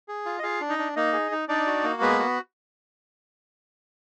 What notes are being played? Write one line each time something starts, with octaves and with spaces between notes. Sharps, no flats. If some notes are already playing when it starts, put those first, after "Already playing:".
G#4
F4
D#5
F4 G#4 F5
D4
D#4 D#5
D4
A#3 D#4 D#5
G#4
D#4
D4 D#4 D5
F#4
A#3
G#3 B3 B4
F#4